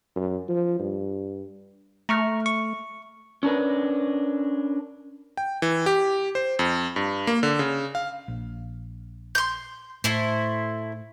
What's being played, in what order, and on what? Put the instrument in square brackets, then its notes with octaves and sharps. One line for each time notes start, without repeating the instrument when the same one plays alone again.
[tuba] F#2
F3
G2
[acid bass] A3 [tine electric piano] A#5 C#6 F6
[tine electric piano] C#6
[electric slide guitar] C#4 D4 A#4 B4
[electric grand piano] G5
E3
G4
C5
F2
G2
A#3
D3
C#3
F5
[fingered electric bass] A#1
[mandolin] C6 G6
[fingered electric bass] A2 [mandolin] A3 E4 C5